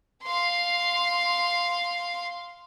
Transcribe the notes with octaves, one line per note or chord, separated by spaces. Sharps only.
F5 C6